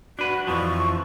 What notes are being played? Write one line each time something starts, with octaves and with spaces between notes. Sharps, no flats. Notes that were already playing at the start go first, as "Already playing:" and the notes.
D4 F#4 B4
F2 E3 F3 C#6